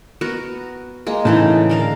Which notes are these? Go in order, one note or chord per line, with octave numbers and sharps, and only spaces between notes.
B3 F#4 A#4
G#3 A#3
A2 C#3 E3 D#4
D3 A#4 F5